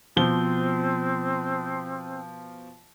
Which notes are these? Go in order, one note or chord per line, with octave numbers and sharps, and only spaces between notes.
B2 F3 C4 G7